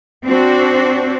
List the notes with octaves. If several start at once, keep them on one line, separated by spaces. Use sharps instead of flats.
C4 D4 F#4